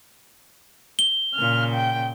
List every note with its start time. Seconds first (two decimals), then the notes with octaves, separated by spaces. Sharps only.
0.99 G7
1.35 A#2 C#3 F6
1.74 G5